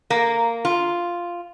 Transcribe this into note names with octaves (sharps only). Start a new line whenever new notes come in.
A#3
F4